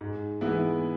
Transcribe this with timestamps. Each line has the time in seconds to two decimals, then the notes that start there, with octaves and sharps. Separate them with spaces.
0.01 G#2
0.41 E3 G#3 B3 E4